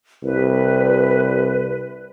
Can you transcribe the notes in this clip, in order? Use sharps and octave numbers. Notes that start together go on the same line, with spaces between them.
C2 B4